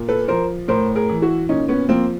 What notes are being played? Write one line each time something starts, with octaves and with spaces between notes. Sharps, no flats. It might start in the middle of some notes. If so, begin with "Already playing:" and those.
Already playing: A#2
A4 B4
F3 A#4 C5
A2 A#4 C5
G#4 A#4
E3
E4 F#4
A#2 C#4 D#4
B3 C#4
F3 A#3 C4